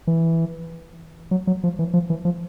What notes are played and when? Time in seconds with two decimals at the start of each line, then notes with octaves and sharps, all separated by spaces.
0.07 E3
1.31 F#3
1.47 F#3
1.64 F3
1.79 E3
1.94 F3
2.10 E3
2.25 F3